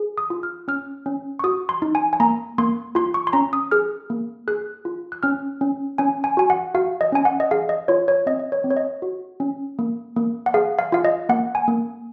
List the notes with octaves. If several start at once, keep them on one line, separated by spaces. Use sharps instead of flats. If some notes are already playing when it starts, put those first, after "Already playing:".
Already playing: G#4
D#6
F4
F6
C#4 F6
C#4
C#6
F#4 D#6
C6
D#4
G#5
G#5
A#3 A#5
A#3 C6
F4 C6
C#6
C6
C#4 A#5
D#6
G#4 F6
A#3
G#4 F#6
F4
F#6
C#4 F6
C#4
C#4 G#5
G#5
F#4 G#5
F#5
F#4 F5
D#5
C#4 G#5
F#5
D#5
G#4 F5
D#5
F4 C#5
C#5
C4 D#5
D#5
C#5
C4
C#5
D#5
F#4
C#4
A#3
A#3
F#5
G#4 F5
F5
F4 F5
D#5
A#3 F#5
G#5
A#3